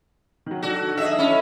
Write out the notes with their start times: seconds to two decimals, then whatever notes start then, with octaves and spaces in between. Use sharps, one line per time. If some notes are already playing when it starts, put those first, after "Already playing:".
0.46 D#3 F#3
0.62 D4 F#4 A4
0.97 D#4 G#4 D#5 E5
1.19 C#4 E4 A4